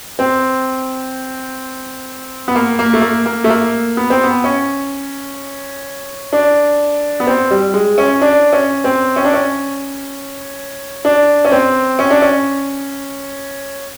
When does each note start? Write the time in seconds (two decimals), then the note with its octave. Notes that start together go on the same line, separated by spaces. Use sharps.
0.19 C4
2.48 B3
2.55 A#3
2.79 A#3
2.93 A3
3.02 A#3
3.26 A#3
3.44 A3
3.49 A#3
3.97 B3
4.10 C4
4.24 B3
4.44 C#4
6.33 D4
7.20 B3
7.27 C4
7.51 G3
7.74 G#3
7.98 C#4
8.22 D4
8.53 C#4
8.84 C4
9.16 C#4
9.25 D4
9.33 C#4
11.05 D4
11.45 C#4
11.52 C4
11.99 C#4
12.11 D4
12.22 C#4